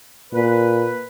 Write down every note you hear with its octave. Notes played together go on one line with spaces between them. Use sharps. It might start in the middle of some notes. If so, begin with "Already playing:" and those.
A#2 B4